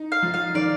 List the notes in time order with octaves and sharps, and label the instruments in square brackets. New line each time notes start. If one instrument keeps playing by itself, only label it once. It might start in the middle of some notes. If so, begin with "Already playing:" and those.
Already playing: [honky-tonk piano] D#4
[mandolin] F5
[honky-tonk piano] F3
[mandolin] F5
[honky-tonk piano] D#3 [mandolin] D5